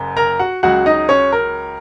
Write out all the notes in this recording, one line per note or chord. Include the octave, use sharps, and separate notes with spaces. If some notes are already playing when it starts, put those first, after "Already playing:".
Already playing: F#1 F#2
A#4 A#5
F#4 F#5
C#2 C#3 F#3 F#4 F#5
D#4 D#5
C#4 C#5
A#4